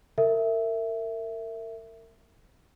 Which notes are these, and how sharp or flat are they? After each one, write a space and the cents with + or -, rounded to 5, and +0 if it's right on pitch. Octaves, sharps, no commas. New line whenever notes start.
A#4 -35 E5 +0